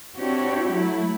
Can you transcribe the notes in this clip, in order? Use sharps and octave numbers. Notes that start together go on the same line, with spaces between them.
C4 D4 E4 F#4 G4 C#5
F#3 A3 E4